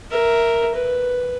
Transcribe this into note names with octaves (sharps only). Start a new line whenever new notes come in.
A#4 E5
B4